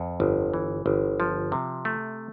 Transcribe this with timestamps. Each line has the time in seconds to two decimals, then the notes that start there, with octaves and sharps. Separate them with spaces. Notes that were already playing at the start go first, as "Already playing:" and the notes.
Already playing: F2
0.20 G1
0.53 E3
0.86 G1
1.20 F3
1.52 C3
1.85 A3